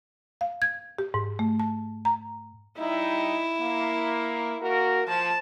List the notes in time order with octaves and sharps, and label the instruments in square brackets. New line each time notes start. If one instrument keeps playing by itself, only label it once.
[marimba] F5
G#6
G4
G#2
A3
A5
A#5
[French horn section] G3 D#4 [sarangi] E4
[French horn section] A#3
A#3 F#4 A#4
[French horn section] F3 [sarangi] A5